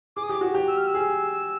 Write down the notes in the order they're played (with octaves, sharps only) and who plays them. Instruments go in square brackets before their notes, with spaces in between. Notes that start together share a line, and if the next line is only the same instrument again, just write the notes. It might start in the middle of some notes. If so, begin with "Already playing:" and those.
[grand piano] G#4 [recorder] D6
[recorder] D#6
[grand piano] G4 [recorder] D6
[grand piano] F#4
G4
[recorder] E6
F6
E6
[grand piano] G#4